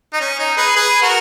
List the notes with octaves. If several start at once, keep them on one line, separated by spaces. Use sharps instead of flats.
D#4
C#4
D#4
G#4 B4
G#4 B4
F#4 A#4